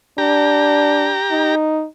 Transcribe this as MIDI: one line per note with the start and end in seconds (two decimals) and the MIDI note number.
0.18 1.16 62
0.18 1.55 67
0.18 1.55 82
1.32 1.86 63